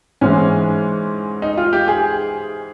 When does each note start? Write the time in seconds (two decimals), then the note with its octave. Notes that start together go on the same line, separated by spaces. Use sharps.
0.21 G#2 E3 G#3 C#4
1.42 D#4
1.58 F4
1.73 G4
1.88 G#4